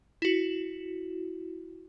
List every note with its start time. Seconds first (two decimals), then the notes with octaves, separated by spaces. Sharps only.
0.22 E4 F#4